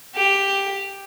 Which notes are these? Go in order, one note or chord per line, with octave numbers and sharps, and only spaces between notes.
G4